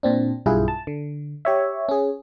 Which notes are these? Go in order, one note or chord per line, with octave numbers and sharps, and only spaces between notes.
A#2 C4 D4
B1 G2 E4 F4 G#4
A5
D3
G4 C#5 E5
C#4 G#4